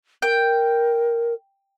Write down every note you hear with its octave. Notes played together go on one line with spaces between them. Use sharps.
A#4 G5